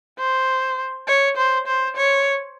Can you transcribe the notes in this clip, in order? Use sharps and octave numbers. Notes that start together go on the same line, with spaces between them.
C5
C#5
C5
C5
C#5